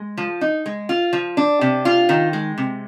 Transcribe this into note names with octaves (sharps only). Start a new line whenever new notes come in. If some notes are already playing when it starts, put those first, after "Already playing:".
Already playing: G#3
F3
D#4
G#3
F4
F3
D4
C3
F4
D#3
G#3
C3